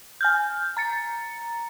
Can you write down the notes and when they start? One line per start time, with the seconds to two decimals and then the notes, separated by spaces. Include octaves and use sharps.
0.21 G#5 F6 G6
0.77 A#5 A6 C#7